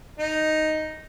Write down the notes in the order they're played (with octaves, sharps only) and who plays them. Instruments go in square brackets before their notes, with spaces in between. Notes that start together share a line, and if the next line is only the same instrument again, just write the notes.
[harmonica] D#4